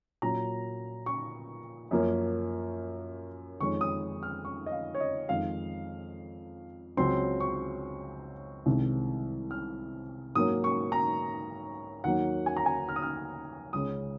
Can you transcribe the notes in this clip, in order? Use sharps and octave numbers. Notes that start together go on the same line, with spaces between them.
A#2 F#3 C#4 A#5
C#6
F#2 F3 A#3 C#4
F2 D#3 G#3 C#4 C#6
D#6
F6
C#6
D#5
F5
C#5
D#5
F2 D#3 G#3 F5
C#2 C#3 F#3 C4 C6
C#6
C2 C3 D#3 G#3 C4
F6
G#2 F#3 A#3 C#4 D#6
C#6
A#5
D#2 D#3 F#3 A#3 F#5
G#5
A#5
G#5
F6
D#6
F6
C#2 C#3 G#3 C#4 D#6